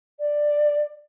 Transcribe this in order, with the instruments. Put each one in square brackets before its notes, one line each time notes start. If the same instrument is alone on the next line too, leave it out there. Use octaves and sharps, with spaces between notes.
[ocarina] D5